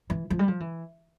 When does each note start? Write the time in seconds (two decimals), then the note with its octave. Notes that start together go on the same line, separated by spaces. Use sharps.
0.10 E3
0.30 F3
0.39 G3
0.48 F3
0.60 E3